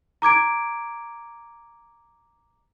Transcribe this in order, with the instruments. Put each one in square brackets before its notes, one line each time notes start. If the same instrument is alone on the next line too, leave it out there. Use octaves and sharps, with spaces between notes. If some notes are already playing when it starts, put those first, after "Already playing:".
[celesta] A#5 D6 G#6 D7